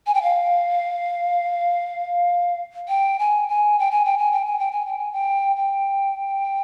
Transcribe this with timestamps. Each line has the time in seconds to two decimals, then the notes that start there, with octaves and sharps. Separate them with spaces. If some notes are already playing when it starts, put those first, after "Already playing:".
0.07 G#5
0.14 G5
0.23 F5
2.89 G5
3.19 G#5
3.49 G#5
3.79 G5
3.91 G#5
4.05 G5
4.18 G#5
4.33 G5
4.46 G#5
4.59 G5
4.72 G#5
4.86 G5
4.99 G#5
5.12 G5
5.56 G5